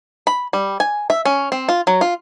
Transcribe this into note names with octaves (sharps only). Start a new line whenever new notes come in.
B5
G3
G#5
E5
C#4
C4
F4
F#3
F4